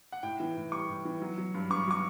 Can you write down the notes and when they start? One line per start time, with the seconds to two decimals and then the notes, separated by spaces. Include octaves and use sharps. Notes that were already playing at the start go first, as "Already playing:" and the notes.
0.12 F#5
0.23 A2 G5
0.40 E3
0.57 A2
0.72 G3 C#6
0.89 A2
1.05 E3
1.22 F#3
1.38 F#3
1.54 G2
1.70 G2 C#6
1.87 F#3 C#6